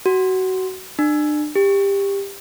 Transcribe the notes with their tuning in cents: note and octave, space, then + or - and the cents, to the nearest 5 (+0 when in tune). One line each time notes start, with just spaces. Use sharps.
F#4 +20
D4 +35
G4 +15